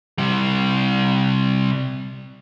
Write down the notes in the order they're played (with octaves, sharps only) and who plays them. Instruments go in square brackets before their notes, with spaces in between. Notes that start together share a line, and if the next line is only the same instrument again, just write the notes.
[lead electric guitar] C3 G3